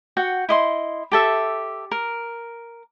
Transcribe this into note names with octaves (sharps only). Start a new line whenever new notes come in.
F#4 F#5 G5
E4 D#5 C6
G4 A4 E5
A#4